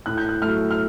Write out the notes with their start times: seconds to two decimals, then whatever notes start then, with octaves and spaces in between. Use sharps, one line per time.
0.06 A2 F#6
0.18 G6
0.29 F#6
0.42 F#3 A3 F6
0.71 F6